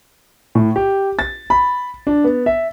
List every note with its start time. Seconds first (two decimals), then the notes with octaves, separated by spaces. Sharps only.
0.55 A2
0.76 G4
1.19 A6
1.50 B5
2.07 D4
2.24 B3
2.46 E5